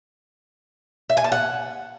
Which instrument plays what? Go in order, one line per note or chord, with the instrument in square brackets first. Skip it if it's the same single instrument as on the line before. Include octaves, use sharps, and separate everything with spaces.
[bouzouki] E5
G#5
A5
F#5